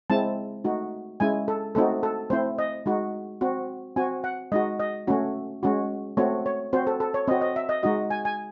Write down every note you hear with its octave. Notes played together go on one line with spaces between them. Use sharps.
G#3 C4 E4 A5
A3 D#4 F#4
G#3 C#4 E4 G#5
A4
A3 C4 D#4 F#4 A4
A4
A3 C4 E4 C5
D#5
G#3 D#4 F#4
C4 F#4
C4 F#4 G#5
F#5
G#3 D#4 F#4 D#5
D#5
A3 C#4 F#4
G#3 C#4 F#4
A3 C4 F#4 C#5
C#5
C4 F#4 C5
A4
A4
C#5
C4 F#4 D#5
D#5
E5
D#5
G#3 D#4 F#4 D#5
G#5
G#5